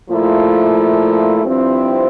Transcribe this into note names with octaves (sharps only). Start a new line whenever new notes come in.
A#2 F3 A3 E4
G2 F3 C4 E4